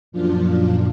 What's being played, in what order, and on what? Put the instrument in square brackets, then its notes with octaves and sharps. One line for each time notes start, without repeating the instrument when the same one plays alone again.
[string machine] F#2 A#2 F3 D4 F4